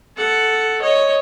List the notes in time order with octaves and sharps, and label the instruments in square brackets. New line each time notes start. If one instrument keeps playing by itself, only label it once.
[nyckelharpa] A4 F#5
C#5 D#5